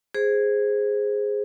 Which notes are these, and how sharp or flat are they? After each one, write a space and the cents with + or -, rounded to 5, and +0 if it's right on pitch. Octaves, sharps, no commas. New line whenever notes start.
G#4 -5 C5 +0